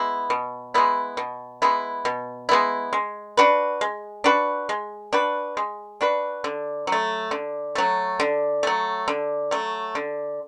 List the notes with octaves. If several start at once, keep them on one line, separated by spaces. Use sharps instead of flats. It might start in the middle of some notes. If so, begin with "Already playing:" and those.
Already playing: G#3 B3 E4
B2
G#3 B3 E4
B2
G#3 B3 E4
B2
G#3 B3 E4
G#3
D4 F#4 B4
G#3
D4 F#4 B4
G#3
D4 F#4 B4
G#3
D4 F#4 B4
D3
F#3 A3
D3
F#3 A3
D3
F#3 A3
D3
F#3 A3
D3